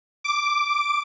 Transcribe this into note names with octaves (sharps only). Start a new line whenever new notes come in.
D6